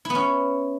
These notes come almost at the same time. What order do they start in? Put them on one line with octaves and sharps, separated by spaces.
E4 B3 C#4